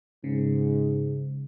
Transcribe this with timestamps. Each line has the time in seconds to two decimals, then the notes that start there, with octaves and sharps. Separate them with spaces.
0.24 G#2 C#3